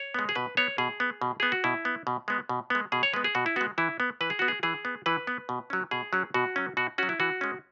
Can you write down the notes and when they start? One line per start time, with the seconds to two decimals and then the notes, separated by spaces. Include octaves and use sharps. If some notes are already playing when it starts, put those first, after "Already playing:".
Already playing: C#5
0.14 G#3 B3
0.29 G#4
0.35 B2 B4
0.57 B3 C#5
0.78 B2 G#4
1.00 B3
1.22 B2
1.40 B3 G#4
1.52 F#4
1.64 B2 E4
1.85 B3
2.07 B2
2.28 G#3 B3
2.49 B2
2.70 G#3 B3
2.92 B2 G#4
3.03 C#5
3.13 G#3 B3 B4
3.24 G#4
3.35 B2 F#4
3.46 E4
3.56 G#3 B3 F#4
3.78 E3 E4
4.00 B3
4.21 E3 B4
4.30 G#4
4.39 B3 F#4
4.48 G#4
4.63 E3 G#4
4.85 B3
5.06 E3 B4
5.27 B3
5.49 B2
5.70 F#3 C#4
5.91 B2 G#4
6.13 F#3 C#4
6.34 B2 F#4
6.56 F#3 C#4
6.77 B2 F#4
6.98 F#3 C#4 F#4
7.09 E4
7.20 E3 F#4
7.41 G#3 C#4